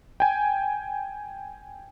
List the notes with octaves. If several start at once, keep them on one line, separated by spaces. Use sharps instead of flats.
G5 G#5